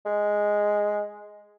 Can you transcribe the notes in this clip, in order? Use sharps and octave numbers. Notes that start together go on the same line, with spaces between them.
G#3